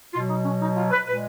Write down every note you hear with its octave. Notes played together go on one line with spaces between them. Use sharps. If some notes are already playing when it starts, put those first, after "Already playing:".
B2 F#3 F4
D#4
C#4
D#4
F4
B4
A#2 G#3 B4